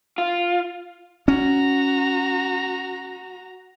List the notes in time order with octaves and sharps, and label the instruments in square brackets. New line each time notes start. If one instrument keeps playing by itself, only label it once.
[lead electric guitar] F4
[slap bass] C#4 [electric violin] F#4 A#5